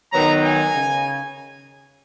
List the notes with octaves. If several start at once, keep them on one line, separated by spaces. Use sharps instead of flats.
D#3 F#3 B3 D#4 A#5
G#5
C#3